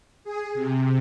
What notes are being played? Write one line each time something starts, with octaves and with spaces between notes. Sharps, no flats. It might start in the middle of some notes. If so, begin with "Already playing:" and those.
G#4
C3